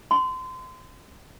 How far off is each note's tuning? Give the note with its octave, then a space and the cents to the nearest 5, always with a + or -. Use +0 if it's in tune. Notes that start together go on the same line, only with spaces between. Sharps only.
C6 -30